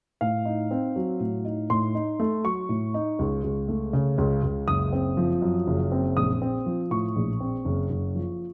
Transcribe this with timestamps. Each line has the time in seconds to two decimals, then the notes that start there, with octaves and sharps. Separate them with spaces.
0.21 A2 F5
0.45 D#4
0.71 C4
0.96 F#3
1.20 A2
1.45 D#4
1.70 A2 C6
1.95 D#4
2.20 A3
2.44 F#3 C#6
2.69 A2
2.94 D#4
3.19 C#2
3.44 C#2
3.68 A3
3.93 C#3
4.18 C#2
4.43 C#2
4.68 F#1 D#6
4.93 C4
5.17 F3
5.42 F#2
5.67 F#1
5.92 C4
6.17 A#1 D#6
6.42 C4
6.66 F3
6.91 A2 C#6
7.16 A#1
7.40 C4
7.65 F#1
7.90 F#1
8.15 F3